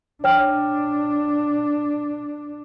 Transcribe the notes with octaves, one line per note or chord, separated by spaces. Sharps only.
D4 C#5 G5 F6